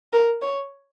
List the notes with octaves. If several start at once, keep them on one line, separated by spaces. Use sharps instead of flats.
A#4
C#5